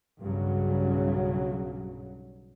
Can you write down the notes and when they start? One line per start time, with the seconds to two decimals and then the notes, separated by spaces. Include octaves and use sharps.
0.20 B1 G2 C#3 F#3